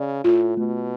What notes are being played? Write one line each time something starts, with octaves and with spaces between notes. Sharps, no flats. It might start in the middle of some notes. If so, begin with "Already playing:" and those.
Already playing: C#3 D5
A2 F4
B2 A3